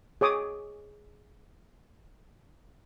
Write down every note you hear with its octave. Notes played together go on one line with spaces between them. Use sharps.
G#4 C#5 D6 D#6